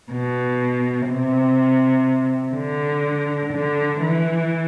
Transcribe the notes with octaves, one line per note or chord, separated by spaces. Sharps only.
B2
C3
D3
D3
E3